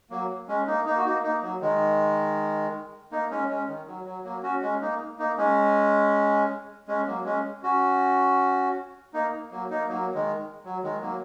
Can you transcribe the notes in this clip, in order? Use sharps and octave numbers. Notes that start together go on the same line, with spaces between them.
F#3 A#3
G#3 C#4
A#3 D#4
A#3 D#4
F#4
A#3 D#4
A#3 D#4
F#3
D#3 G#3
A#3 D#4
G#3 C#4
G#3 C#4
D#3
F#3
F#3
F#3 A#3
C#4 F#4
G#3 C#4
A#3 D#4
A#3 D#4
G#3 C#4
G#3 C#4
F#3 A#3
G#3 C#4
C#4 F#4
A#3 D#4
F#3 A#3
A#3 D#4
F#3 A#3
D#3 G#3
F#3
D#3 G#3
F#3 A#3